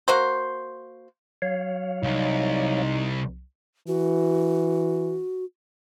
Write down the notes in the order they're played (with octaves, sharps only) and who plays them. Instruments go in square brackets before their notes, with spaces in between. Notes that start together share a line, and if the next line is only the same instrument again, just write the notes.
[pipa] A#3 F#4 C5
[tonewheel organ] F#3 C#5 F5
[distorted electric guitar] C2 [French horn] D#4
[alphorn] E3 [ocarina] F#4